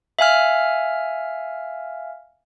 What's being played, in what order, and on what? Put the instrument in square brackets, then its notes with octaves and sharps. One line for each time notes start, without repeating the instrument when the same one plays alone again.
[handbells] E5 F5 G#5 F6